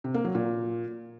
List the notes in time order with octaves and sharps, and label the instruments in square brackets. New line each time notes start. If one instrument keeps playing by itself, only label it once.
[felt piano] C3
A#3
F#3
A#2